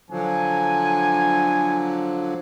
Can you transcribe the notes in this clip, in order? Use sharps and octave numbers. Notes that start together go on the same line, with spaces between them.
D3 F3 F#3 G#5